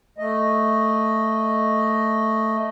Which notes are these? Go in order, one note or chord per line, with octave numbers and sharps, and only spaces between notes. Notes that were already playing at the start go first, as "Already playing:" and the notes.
A3 D#5